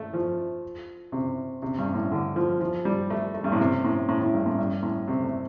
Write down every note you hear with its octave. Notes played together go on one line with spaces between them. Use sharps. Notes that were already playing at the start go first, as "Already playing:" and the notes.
Already playing: A3
F3
C3
C3
G2
A2
D3
F3
F3
G3
A3
A3
G2
A2
C3
A2
A2
A2
G2
A2
G2
A2
C3
A3